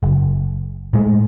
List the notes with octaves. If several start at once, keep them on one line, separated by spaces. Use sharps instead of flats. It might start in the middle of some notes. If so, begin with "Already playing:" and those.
F#1
A2 G#3